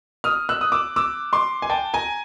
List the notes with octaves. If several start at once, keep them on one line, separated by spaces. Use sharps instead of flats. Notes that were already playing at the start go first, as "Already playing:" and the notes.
D#6 F6
E6 F#6
D#6
D6 E6
D6 E6
C6 D6
G#5
G5 A5
G#5 A#5